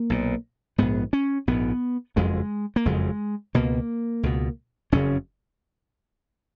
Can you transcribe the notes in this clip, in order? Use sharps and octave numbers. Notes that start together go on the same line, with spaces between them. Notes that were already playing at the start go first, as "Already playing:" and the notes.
Already playing: A#3
B1 A#2
A#1 G#2 B3
C#4
A#1 G#2 B3
F#1 F2 C#3 G#3
A#3
F#1 F2 C#3 G#3
C#2 B2 A#3
C#2 B2
F#1 F2 C#3 C#4